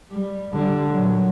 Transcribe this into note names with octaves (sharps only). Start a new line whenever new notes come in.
G3
D3 G3
A#2 F#3